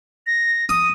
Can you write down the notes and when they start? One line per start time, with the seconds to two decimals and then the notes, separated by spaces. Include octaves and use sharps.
0.27 A#6
0.69 D#6 D#7